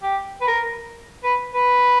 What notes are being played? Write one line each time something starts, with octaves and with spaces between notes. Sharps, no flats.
G4
B4
A#4
B4
B4